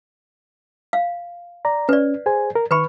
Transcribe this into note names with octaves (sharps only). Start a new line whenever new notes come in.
F5
D5 A#5
C#4 B4 D5
G#4 C5 G#5
A#4
D#3 B4 B5 C#6